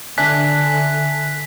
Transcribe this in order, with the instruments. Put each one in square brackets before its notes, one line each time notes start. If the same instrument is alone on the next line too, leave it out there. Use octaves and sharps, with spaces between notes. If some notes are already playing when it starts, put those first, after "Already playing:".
[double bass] D3 [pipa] D4 [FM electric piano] E5 G#5 F#6 [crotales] B6